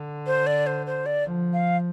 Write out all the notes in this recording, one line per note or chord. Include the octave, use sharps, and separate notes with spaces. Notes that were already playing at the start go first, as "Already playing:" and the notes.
Already playing: D3
C5
D5
C5
C5
D5
F3
F5